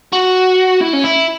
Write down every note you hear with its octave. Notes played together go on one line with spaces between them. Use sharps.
F#4
E4
C#4
E4